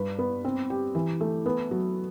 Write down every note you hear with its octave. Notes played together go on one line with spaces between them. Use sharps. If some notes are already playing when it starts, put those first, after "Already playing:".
Already playing: G2 B4
B3
C4
G4
E3
A3
B3
F#3